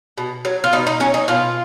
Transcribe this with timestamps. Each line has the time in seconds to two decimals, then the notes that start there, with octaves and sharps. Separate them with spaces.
0.18 B2
0.45 F#3
0.64 F4
0.73 B2 D#4
0.87 D#4
1.00 F#3 C#4
1.14 D#4
1.28 B2 F4